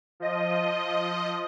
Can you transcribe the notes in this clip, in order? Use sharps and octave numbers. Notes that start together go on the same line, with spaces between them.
F3 D#5